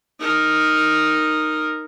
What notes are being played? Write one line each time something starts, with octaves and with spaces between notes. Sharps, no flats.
D#4 A#4